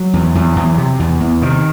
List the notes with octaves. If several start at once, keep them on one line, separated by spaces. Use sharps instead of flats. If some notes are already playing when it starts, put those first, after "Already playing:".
Already playing: F#3
E2
E2
E2
C3
E2
E2
C3 D#3